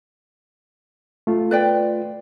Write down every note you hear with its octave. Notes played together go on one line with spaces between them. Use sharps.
A3 F4
B4 D5 G5